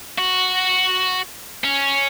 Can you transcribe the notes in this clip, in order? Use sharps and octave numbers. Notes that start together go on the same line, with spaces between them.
F#4
C#4